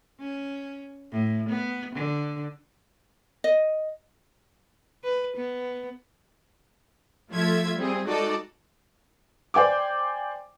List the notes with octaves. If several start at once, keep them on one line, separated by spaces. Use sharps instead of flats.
C#4
A2
B3
D3
D#5
B4
B3
F3 A3 F4 E5 G#6
G3 C4 G#4
G#3 D#4 F#4 A4 D5
C5 D5 G5 G#5 D6